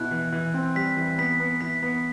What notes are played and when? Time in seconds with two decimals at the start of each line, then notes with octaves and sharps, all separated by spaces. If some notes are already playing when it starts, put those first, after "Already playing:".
Already playing: B2 E4 F#6
0.11 E3
0.32 E3
0.54 C4
0.75 G3 B6
0.97 E3
1.18 B3 B6
1.40 B3
1.61 E3 B6
1.83 B3